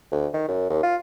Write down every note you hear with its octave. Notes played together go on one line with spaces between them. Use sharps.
D2
D#3
F#2
D#2
F4